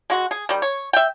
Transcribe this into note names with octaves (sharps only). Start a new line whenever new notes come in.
G#3 F#4
G#4
D#3 G3
C#5
E5 G5